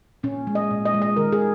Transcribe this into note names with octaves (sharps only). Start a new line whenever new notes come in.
A#2 C#4
G#3
D#5
A#2
D#5
G#3
D#5
D#3 A#4
G#4